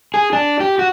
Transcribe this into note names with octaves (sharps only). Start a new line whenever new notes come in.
G#4
D4
G4
F#4